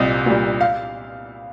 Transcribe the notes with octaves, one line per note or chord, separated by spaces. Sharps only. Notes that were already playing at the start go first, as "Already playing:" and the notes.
Already playing: C2 A#2 G3 D#5
A#2 G3
F5